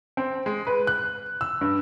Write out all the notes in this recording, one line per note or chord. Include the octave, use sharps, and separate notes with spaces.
C4
G#3
B4
F#6
E6
G2